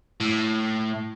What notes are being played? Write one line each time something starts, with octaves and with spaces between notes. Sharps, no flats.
A2